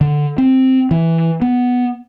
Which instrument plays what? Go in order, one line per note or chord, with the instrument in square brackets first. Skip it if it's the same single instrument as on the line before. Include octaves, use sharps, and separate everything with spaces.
[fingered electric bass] D3
C4
E3
B3